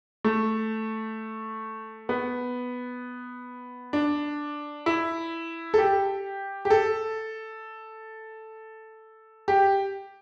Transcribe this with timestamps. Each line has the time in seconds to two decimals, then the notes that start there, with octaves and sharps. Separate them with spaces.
0.24 A3
2.09 B3
3.93 D4
4.86 E4
5.74 A4
5.78 G4
6.65 G4
6.70 A4
9.48 G4